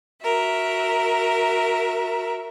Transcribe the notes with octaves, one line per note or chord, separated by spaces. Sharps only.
F#4 A#4 E5